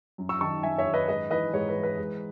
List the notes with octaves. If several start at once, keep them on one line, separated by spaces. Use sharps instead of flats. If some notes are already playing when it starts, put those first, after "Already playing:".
F#2
C#6 E6
D#3 A5 C#6
F#2 E5 G#5
C#5 E5
D#3
B4 D#5
G#2 B4 D#5
E3 B4 D#5
G#2 C#5
B4
E3
B4
G#2